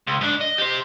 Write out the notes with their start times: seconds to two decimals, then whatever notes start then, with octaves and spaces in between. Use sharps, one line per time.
0.07 C#2
0.21 G#2 D4
0.41 D#5
0.58 G4 C5